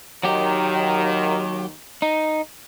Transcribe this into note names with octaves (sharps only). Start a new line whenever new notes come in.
D#2 D#3 F#3 G4
D#4